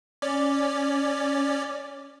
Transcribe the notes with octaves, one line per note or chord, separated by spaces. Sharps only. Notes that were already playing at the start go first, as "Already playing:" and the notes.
C#4 D5